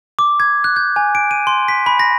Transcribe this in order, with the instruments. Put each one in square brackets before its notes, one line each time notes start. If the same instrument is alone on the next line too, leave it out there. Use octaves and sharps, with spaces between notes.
[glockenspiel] D6
G#6
F#6
G6
G#5
D7
D#7
C6
B6
B5
A#6